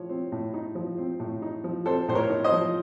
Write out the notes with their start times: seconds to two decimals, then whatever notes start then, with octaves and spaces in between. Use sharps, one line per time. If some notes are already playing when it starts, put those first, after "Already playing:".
Already playing: A2 F3 C#5
0.10 C4
0.32 A2
0.54 D#4
0.75 F3
0.98 C4
1.20 A2
1.42 D#4
1.64 F3
1.86 C4 A4 C5
2.08 A2 C5
2.15 A#4 C#5
2.30 D#4
2.44 C5 D#5
2.52 F3